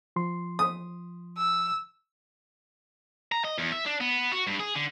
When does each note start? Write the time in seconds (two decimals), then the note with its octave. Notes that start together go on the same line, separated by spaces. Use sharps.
0.16 F3 C6
0.59 D#6
1.38 E6
3.32 A#5
3.44 D#5
3.58 E2
3.72 E5
3.86 D4
4.01 B3
4.33 F#4
4.47 G2
4.60 G#4
4.75 D3